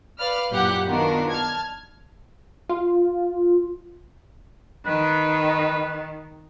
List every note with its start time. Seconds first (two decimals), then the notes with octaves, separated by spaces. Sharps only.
0.19 B4 D5 F5 B5 F6
0.51 F#2 A#2 E4 G4 F#5
0.88 D#3 B3 D4 F4 F#4 A#4
1.30 A5 F6 G#6
2.69 F4
4.86 D#3 B4